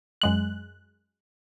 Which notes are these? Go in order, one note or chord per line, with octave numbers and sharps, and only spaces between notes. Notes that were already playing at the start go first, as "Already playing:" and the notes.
F#2 G#3 F#6